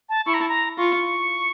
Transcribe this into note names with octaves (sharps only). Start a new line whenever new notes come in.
A5
E4 C#6
A#5
A5
A#5
F4 C#6